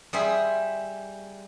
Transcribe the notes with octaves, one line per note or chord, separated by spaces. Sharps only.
G3 G#4 C5 E5